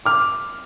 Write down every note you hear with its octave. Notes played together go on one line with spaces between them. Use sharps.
D6 F6